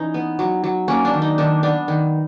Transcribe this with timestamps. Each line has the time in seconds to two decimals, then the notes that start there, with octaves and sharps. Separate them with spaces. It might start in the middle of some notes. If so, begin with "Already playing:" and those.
Already playing: E3 C#4 D#4
0.14 B3
0.39 F#3
0.64 F#3
0.88 A#3 C#4
1.05 D4
1.13 D#3
1.22 D#4
1.38 D#3 D4
1.63 B3 D4
1.88 D#3